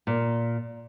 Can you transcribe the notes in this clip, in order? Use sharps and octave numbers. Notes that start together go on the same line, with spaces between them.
A#2